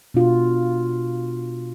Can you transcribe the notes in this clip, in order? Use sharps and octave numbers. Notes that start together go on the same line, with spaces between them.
B2 D4 F4 F#4